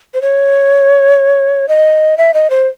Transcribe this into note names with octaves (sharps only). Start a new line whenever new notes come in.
C5
C#5
D#5
E5
D#5
C5